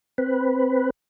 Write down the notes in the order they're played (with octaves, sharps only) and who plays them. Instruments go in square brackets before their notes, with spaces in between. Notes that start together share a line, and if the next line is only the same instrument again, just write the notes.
[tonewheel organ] C4 B4